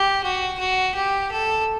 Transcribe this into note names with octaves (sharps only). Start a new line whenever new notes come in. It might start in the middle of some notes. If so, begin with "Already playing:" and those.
Already playing: G4
F#4
F#4
G4
A4